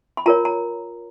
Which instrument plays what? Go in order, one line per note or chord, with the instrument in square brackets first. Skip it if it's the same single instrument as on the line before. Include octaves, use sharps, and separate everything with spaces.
[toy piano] B5
F4 A#4 C#5 A#5
A#5